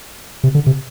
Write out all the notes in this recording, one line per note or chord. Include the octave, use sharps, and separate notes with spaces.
C3
D3
C3